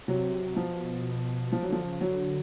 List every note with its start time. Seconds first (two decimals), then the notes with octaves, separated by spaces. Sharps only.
0.08 C3 F#3
0.56 B2 F3
1.52 F3
1.63 F#3
1.69 D3 F3
1.85 C#3
2.01 D3 F#3